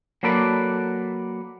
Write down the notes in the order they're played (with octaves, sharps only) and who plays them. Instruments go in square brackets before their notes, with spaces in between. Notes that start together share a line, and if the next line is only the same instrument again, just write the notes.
[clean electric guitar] F#3 A#3 A4 B4 D5